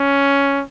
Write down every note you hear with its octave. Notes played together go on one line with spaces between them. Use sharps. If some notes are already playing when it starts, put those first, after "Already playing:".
Already playing: C#4